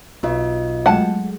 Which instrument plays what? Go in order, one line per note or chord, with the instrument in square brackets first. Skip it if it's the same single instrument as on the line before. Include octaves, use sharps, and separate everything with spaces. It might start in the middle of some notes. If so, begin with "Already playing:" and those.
[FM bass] B1 [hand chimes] B3 F4 D#5
[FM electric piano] F#3 G#3 A3 [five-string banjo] F#5 A5